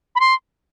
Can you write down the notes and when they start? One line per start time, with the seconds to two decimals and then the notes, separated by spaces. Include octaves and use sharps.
0.15 B5
0.20 C6